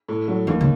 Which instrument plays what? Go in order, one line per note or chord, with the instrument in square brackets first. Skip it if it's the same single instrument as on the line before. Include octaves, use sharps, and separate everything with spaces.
[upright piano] A2
F#3 A3
[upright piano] D#2 [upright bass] E3
[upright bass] C#3